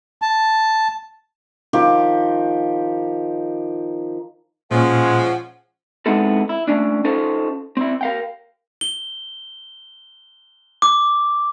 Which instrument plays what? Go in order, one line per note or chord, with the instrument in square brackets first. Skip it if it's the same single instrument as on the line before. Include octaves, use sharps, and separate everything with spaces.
[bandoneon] A5
[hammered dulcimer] D#3 F3 G4
[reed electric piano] A#2 [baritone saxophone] F3 [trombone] G#3 [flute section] C#4 F#5
[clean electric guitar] G#3 B3 C4 D#4 E4 A4
E4
A3 C#4 D4
C#4 D#4 F4 A4 C5
C4 E4
A#4 F5 G5
[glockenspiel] G7
D6